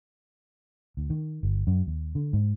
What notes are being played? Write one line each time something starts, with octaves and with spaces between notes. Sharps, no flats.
D2
D#3
G1
F#2
D#2
D3
G#2